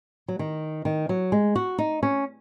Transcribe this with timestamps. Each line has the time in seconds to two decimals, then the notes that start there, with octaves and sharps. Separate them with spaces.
0.28 F#3
0.39 D#3
0.85 D#3
1.09 F#3
1.32 G#3
1.55 F#4
1.78 D#4
2.03 C#4